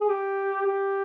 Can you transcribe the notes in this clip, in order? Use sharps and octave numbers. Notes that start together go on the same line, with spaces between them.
G#4
G4
G4